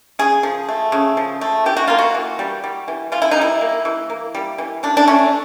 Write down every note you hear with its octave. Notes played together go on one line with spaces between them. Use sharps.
C#3 G#4
F3
A3
C#3
F3
A3
E3 G4
F#4
A#3 F4
F#4
E3
G3
G3
E3
E3 F4
E4
D#4
G3 E4
A#3
E3
A#3
G3
E3
E3 D4
D4
A3 C#4